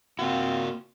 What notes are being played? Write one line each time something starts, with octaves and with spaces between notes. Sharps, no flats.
A#3 C4 F4 F#4